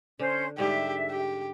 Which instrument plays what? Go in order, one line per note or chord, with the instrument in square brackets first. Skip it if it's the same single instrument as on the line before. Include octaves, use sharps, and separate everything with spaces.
[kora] D3 [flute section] C#4 C5
[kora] G#2 D3 G3 [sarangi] G4 [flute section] E5
[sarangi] G4